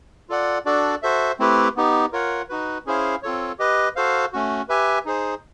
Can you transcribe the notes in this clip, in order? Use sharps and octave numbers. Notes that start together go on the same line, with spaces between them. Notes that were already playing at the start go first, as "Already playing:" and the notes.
F4 A4 D5 F#5
D4 F#4 A4 D5
F#4 A4 C5 E5
A3 C4 E4 G4 B4
B3 D#4 G4
F4 A#4 C#5 F#5
D#4 F#4 B4
C#4 E4 G#4 C5 F5
C4 F4 A4 C#5
G4 B4 D#5
F#4 A4 C5 F5
A3 C#4 F#4
G4 B4 E5 G#5
D#4 G#4 C5